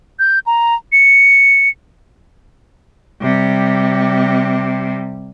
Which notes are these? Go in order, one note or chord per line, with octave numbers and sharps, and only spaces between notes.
G6
A#5
C#7
C3 G3